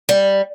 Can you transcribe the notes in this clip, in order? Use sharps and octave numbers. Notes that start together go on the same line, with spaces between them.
G3